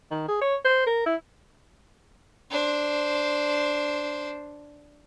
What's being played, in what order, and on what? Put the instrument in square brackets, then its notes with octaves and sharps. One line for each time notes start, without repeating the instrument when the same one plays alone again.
[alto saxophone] D#3
G#4
C#5
C5
A#4
E4
[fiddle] D4 C5